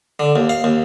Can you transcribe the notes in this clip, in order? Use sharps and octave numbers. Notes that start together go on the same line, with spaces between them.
D3
D#2
F5
D#2